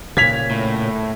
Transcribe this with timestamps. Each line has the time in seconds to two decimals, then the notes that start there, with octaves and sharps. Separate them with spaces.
0.17 A#2 C#3 G#6 B6 F7
0.51 A2